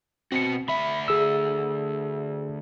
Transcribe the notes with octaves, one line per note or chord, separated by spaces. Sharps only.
B2 C4 F#4 C#7
D2 E5 B5
G#4 E6